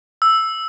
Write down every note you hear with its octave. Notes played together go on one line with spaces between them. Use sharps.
E6